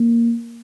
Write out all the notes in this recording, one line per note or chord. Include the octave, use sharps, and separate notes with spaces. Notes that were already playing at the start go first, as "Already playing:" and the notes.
Already playing: A#3